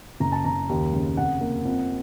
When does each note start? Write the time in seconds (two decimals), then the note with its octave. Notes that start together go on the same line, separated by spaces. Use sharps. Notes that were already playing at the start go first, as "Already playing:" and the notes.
0.20 F#1 A#5
0.32 A5
0.44 F#1 A#5
0.69 D#2
0.93 C#3
1.17 F1 F#5
1.41 A#3
1.65 F2